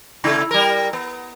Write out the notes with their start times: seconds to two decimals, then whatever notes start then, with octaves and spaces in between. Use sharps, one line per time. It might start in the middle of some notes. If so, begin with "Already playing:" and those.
0.24 C#3 A3 E4
0.51 G3 A#4
0.93 B3